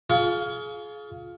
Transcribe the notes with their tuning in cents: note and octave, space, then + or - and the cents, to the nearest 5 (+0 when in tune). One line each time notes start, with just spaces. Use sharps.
F4 +10 G#4 +30 C#6 +35